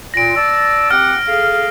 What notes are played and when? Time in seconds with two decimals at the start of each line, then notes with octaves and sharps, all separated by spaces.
0.14 A#2 A#6 D7
0.36 D5 A5 E6
0.91 C4 G4 F#5 F6
1.28 G#4 A4 F5